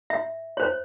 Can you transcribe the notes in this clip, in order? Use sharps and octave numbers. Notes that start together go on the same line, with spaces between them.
E5
C5 C#5